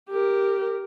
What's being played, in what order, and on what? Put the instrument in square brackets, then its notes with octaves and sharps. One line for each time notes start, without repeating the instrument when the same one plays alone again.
[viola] G4 A#4